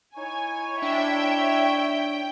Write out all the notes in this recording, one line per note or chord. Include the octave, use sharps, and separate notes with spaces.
D#4 E4 C#5 G#5
D4 E5 G5